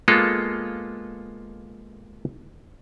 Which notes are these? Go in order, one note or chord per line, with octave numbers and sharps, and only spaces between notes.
G#3 A#3 B3 F4 A4